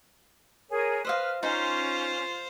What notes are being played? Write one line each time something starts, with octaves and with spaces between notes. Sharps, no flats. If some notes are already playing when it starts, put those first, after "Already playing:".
G#4 A#4 C#5
B4 C5 D#5 F5 F6
C#4 D#4 F4 C5 F5